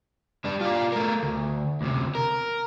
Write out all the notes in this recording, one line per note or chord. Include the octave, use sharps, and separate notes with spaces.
G3 D4
F4 D5
A3 A#4
D2
D2 C3
A#4